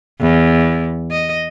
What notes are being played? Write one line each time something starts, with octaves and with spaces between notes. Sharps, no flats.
E2
D#5